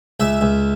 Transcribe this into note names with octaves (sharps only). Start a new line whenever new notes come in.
C#2 E5
C#2